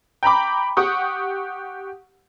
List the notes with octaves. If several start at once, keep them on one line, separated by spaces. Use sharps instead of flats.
G5 A#5 B5 D6
G4 F#5 C#6 D#6